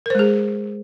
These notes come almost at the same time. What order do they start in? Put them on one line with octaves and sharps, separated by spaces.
A#4 C5 G#3 G#4